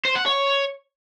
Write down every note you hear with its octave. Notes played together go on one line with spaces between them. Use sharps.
C5
F#5
C#5